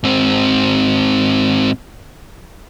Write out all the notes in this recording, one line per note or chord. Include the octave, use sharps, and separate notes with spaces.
G#2 C4